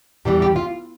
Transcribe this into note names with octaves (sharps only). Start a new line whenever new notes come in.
E2 E3 G3 G4
G4
F4